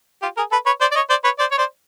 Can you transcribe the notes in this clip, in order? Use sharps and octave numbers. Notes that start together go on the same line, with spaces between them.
F4 G4
G#4 A#4
A4 B4
B4 C#5
C5 D5
D5
C#5 D#5
C5 D5
B4 C#5
C5 D5
C#5
C5 D5